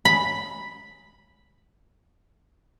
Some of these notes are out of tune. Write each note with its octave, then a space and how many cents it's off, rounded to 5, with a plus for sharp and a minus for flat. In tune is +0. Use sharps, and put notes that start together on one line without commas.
B5 +0